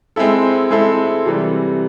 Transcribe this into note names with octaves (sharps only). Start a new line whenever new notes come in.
G#3 C4 E4 A4
G#3 C4 E4 A4
C3 E3 G3